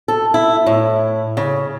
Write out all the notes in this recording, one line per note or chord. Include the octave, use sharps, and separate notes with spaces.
A4
E4
A2
C#3